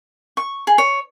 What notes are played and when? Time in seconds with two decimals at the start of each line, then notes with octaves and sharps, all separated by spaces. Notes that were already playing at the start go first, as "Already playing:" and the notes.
0.37 C#6
0.67 G#4
0.78 C#5